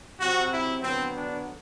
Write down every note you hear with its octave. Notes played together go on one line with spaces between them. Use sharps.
C3 F#3 C4 F#4
E4
D3 F#3 B3 C4
D4